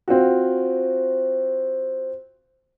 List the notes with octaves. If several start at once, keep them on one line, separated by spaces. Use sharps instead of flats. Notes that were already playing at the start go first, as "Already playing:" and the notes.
C4 F4 F#4